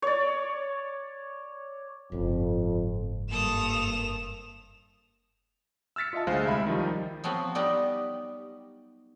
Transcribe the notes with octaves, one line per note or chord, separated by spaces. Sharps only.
C#5 D5
F#1 F2 G#2
G2 A#3 A4 D#6 E7 F7
E6 F6 A6 B6 C#7
F4 D#5 E5 A5
D2 G#3 C5 F5
C2 E5 B5
D#3 F3 G3 D#4
F3 F#3 B3 C4
F#3 G3 B3 D#4 G4